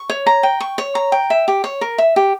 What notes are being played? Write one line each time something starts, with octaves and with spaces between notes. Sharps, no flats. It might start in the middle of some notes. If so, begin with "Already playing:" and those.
Already playing: C#6
C#5
A#5
G5
C#6
C#5
A#5
G5
E5
G4
C#5
A#4
E5
G4